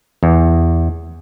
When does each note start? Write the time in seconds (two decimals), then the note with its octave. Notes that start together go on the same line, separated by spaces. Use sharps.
0.23 E2